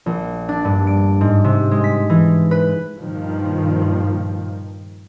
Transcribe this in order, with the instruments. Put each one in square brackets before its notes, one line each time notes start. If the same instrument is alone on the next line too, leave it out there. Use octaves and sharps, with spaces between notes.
[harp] A#1
D4
G2
D7
G#2
C3
G#3
B6
E3
B4
[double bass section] G2 A#2 D#3 F3